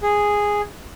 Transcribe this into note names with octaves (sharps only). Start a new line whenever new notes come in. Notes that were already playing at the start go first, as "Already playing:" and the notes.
G#4